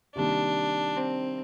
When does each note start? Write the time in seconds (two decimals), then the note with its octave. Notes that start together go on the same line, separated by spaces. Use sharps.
0.15 C3 D#3 G3 A#3 D4
0.97 C4